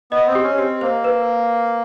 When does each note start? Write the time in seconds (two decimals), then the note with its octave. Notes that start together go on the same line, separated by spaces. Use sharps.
0.11 B3 D#5
0.27 C4
0.35 G4
0.43 C#4
0.58 C4 G4
0.81 A#3 C5
1.04 B4